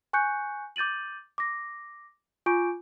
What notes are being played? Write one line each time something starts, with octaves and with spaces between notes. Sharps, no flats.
G#5 C#6 F#6 G6 C#7
D6 G6 A6 D#7 F#7
D6 A#6
F4 G#5 C#6 D6 G6 D7